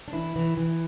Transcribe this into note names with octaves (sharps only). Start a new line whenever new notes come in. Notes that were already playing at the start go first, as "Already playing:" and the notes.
D4
E3 E4
E3
E3